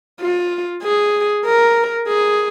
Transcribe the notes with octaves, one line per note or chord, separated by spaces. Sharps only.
F4
G#4
A#4
G#4